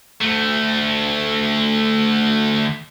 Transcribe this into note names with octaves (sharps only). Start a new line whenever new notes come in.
D2 A3